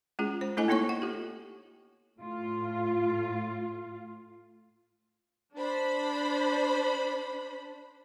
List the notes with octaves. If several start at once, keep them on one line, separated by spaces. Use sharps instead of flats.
G#3 C#4 F4 G#4
C5
A3 D4 E4 A4 D#5 G#5
A#3 B3 D#4 A4 C#5 C#6
F#5
F4 G4
A2 F4
D4 C5 B5